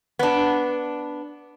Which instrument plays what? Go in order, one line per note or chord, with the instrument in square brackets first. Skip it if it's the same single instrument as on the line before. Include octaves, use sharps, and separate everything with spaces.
[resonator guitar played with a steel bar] B3 D4